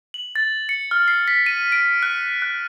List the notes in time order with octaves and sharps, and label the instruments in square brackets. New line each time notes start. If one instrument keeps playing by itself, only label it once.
[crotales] F#7
A6
C#7
F6
C7
B6
D#7
D7
F#6
F#6